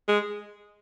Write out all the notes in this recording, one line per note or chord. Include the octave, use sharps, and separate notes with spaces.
G#3